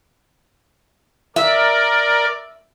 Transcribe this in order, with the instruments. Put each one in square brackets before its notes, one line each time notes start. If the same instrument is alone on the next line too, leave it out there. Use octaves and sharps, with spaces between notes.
[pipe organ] A#4 D5 [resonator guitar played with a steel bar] E5